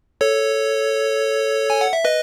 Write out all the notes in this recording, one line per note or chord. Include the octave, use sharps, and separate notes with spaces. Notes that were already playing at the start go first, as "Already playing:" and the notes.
A4 C#5
G#5
F#5
E5
B4 D#5